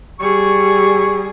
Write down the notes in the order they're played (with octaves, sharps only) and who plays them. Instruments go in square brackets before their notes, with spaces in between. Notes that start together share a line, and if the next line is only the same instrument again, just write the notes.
[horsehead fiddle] G3 G#4 [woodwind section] C#6